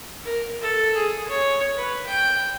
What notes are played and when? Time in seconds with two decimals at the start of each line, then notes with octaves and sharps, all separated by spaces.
0.25 A#4
0.61 A4
0.95 G#4
1.28 C#5
1.76 B4
2.06 G5